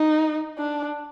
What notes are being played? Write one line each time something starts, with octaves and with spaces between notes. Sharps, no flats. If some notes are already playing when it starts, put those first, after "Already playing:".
Already playing: D#4
D4